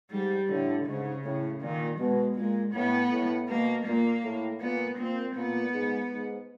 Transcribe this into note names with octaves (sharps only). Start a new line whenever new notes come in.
G#2 G3
A2 D3
G#2 C#3
A2 C#3
A#2 D#3
B2 G#3
A#2 G#3
A2 B3
A2
B2 A#3
A#2 A#3
A2
A#2 B3
A#2 C4
A#2 B3
G#2
G#2